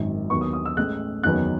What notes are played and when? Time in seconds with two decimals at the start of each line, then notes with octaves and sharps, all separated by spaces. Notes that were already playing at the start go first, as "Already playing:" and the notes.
Already playing: G#1 F#2 D#3
0.30 D#2 D#3 F#3 B3 C#6
0.41 D#6
0.53 D#6
0.65 E6
0.76 A1 A2 G#3 F#6
1.23 F#1 E2 D#3 F#3 B3 F#6